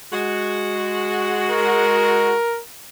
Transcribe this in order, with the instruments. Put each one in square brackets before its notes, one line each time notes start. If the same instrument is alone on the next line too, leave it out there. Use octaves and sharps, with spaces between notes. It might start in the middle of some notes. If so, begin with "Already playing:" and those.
[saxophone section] G#3 F#4
[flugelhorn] A#4